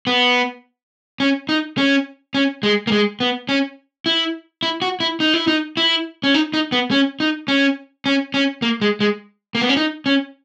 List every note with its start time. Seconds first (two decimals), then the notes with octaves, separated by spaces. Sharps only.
0.07 B3
1.20 C#4
1.49 D#4
1.78 C#4
2.34 C#4
2.63 G#3
2.87 A#3
2.92 G#3
3.20 B3
3.49 C#4
4.06 E4
4.63 E4
4.82 F#4
5.00 E4
5.20 D#4
5.34 E4
5.47 D#4
5.77 E4
6.24 C#4
6.34 D#4
6.54 D#4
6.72 B3
6.91 C#4
7.20 D#4
7.48 C#4
8.06 C#4
8.34 C#4
8.62 A#3
8.81 G#3
9.00 G#3
9.55 A#3
9.61 B3
9.69 C#4
9.77 D#4
10.06 C#4